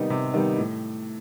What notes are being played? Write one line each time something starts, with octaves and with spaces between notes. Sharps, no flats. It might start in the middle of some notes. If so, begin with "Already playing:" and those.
Already playing: C3 D#3 G3 B3 D#4
C3
D#3 G3 B3 D#4
A2